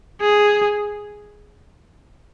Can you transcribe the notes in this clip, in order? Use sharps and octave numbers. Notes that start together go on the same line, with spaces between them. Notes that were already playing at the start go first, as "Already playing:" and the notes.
G#4